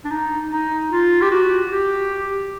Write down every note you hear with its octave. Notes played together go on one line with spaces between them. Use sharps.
D4
D#4
D#4
F4
G4
F#4
G4